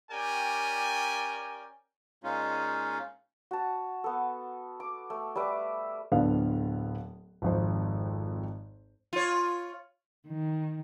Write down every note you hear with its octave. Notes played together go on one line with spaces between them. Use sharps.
C#4 G4 A#4 D5 G5 G#5
A#2 G#3 C#4 D#4 F4
F#4 A5
B3 A4
D6
A3
G3 B4 E5 D6
D1 D3 B3 F5
G#1 F2 C5
F4 C#5
D#3